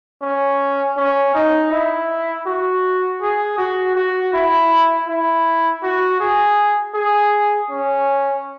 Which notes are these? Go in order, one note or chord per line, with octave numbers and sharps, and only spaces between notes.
C#4
C#4
D#4
E4
F#4
G#4
F#4
F#4
E4
E4
F#4
G#4
G#4
C#4